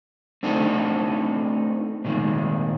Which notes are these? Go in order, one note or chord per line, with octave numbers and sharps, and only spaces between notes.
A3 C4 D4 D#4 F#4 A4
A#2 D#3 G#3